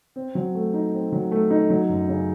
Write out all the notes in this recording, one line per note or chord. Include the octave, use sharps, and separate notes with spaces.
C4
F#3
A3
D#4
C4
F#3
A3
D#4
F#3
F#2
C#3